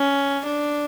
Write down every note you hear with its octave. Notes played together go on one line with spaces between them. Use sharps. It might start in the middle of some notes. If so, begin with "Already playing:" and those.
Already playing: C#4
D4